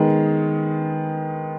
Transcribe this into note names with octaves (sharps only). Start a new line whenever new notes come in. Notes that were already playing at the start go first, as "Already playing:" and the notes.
Already playing: D#3 G#3 B3